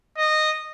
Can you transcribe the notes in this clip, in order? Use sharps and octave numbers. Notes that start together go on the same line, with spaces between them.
D#5